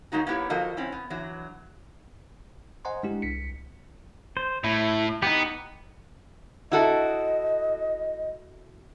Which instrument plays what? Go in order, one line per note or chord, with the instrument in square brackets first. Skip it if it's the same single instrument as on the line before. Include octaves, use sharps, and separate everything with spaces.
[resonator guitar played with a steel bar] F#3 G#3 A#3 D#4 F#4
A#3 B3 E4 G4 C#5
F3 F4 F#4 A4 A#4 D#5
C4 C#4 E4
B3
E3 F#3 D4
[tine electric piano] C5 D#5 F#5 G#5 A#5 C6
G#3 D4 E4 G4
C2 B6 C#7
[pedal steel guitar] C5
[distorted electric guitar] A2 [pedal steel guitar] E4
[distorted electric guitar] B3 [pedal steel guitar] D#4 G4
[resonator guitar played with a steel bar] E4 F#4 A4 [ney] D#5